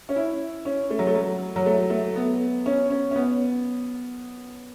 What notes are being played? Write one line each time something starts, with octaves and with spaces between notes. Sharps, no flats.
C#4
E4
C#4
A3
F#3
A3
F#3
F#3
A3
A3
B3
C#4
C#4
C#4
B3